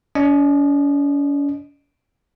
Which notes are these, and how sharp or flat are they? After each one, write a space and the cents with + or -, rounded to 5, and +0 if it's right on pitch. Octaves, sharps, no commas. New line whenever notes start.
C#4 +45 D#5 -20